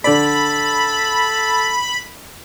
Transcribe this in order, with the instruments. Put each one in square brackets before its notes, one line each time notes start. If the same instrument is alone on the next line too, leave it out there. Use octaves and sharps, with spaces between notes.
[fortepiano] D3 D5 [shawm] A4 [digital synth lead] B5